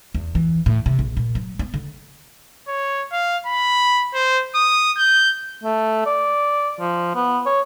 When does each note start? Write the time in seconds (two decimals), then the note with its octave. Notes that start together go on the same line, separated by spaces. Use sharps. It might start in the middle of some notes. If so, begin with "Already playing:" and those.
0.15 E2
0.35 E3
0.66 A2
0.86 C3
0.99 A#1
1.17 A#2
1.35 F#3
1.59 B3
1.74 D3
2.68 C#5
3.12 F5
3.46 B5
4.14 C5
4.55 D#6
4.98 G6
5.64 A3
6.06 D5
6.80 F3
7.15 B3
7.46 C#5